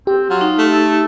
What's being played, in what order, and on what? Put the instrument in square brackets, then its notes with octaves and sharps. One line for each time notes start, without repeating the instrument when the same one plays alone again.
[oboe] C4 [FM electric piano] G4
[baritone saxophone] F#3 [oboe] F4
[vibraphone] D#4
[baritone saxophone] A3
[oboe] A4